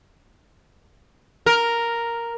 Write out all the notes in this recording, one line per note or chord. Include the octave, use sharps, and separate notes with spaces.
A#4